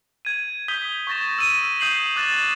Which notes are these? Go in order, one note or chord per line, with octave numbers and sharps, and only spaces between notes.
G#6 D#7
D#6 G6 B6 G7
C#6 G6 A6 A#6 E7
E6 D#7
D#6 G6 C7 D#7 F#7
D6 F#6 A6 E7 F#7